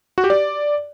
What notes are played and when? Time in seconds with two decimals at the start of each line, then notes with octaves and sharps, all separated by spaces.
0.18 F#4
0.24 G4
0.30 D5